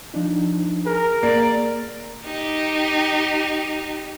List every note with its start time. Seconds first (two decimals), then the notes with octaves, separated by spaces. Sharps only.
0.14 F3 D4 D#4
0.86 G#4 A#4
1.23 A#3 D5
2.25 D#4 G4